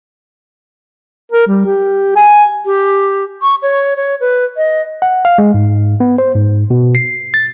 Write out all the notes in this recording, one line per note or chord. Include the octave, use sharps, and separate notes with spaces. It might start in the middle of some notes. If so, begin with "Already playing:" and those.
A#4
G3
G4
G#5
G4
C#6
C#5
C#5
B4
D#5
F#5
F5
G#3
G#2
B3
C5
G#2
B2
C7
A6